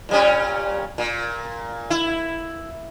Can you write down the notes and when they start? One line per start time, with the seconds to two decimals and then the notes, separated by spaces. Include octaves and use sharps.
0.09 A#2 G3 C#4
0.98 A#2
1.90 E4